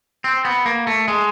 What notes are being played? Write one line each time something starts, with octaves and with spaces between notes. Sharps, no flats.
C4
B3
A#3
A3
G#3